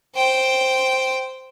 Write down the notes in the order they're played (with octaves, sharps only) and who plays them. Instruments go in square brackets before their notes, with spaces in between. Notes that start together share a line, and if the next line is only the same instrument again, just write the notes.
[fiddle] C5 G5